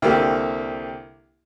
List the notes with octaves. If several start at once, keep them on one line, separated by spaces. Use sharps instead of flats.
C2 D3 A#3 G4